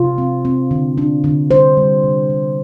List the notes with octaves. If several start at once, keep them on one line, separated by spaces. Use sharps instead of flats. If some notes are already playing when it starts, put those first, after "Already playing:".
Already playing: C3 F4
C4
C4
D3
D4
D3
G3 C5
G3
C3
G3